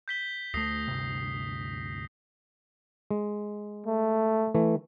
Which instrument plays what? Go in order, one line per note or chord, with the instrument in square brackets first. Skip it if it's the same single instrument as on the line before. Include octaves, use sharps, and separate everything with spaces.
[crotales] G6 B6 G7
[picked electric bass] D2 A3 [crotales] D#6 A#6 C7
[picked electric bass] D2 G2 C3
[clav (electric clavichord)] G#3
[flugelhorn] A3
[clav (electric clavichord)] E3 A3